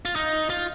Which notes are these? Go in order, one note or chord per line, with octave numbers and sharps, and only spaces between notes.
F4
D#4
F4